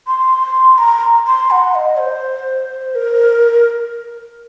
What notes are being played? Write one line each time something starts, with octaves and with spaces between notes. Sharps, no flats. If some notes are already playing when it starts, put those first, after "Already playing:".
C6
A#5
C6
F#5
D#5
C5
A#4